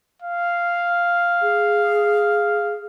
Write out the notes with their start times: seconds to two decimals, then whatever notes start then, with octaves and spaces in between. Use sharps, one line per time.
0.22 F5
1.42 G#4